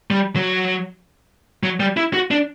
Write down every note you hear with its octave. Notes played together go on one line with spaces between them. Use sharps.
G3
F#3
F#3
G3
E4
F#4
D4